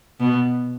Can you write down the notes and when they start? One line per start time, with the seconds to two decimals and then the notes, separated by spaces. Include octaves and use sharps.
0.20 B2 B3